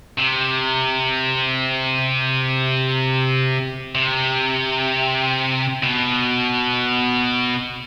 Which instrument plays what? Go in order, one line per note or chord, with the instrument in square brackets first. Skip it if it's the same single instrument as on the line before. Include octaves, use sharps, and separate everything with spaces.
[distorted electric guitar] C3
C3
B2